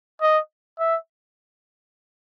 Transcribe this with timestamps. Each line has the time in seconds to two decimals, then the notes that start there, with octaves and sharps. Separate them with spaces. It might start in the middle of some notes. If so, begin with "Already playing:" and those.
0.21 D#5
0.79 E5